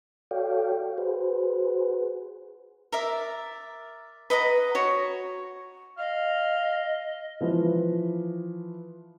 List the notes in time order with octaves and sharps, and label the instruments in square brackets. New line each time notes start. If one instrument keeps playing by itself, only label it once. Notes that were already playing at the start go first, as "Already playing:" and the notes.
[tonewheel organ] F#4 A4 C#5 D5 F5 G5
F#4 G#4 B4 C5
[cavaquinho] A#4 D5 E5
B4 D#5 F#5 A#5
F#4 C#5
[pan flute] D#5 [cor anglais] F5
[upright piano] E3 F3 B4